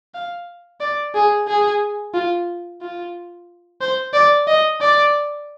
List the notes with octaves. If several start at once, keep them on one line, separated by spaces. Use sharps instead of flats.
F5
D5
G#4
G#4
F4
F4
C5
D5
D#5
D5